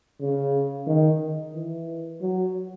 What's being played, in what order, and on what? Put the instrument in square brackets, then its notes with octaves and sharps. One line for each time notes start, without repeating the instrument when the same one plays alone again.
[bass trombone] C#3
D#3
E3
F#3